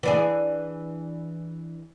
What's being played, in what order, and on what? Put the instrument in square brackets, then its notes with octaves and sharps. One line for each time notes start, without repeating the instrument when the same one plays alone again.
[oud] E3 D4 G#4